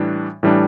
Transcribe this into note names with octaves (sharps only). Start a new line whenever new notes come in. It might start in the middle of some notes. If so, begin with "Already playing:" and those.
Already playing: A2 E3 G3 D4
A2 E3 G3 D4